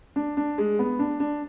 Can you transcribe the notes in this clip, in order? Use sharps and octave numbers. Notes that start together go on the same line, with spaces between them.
D4
D4
G#3
B3
D4
D4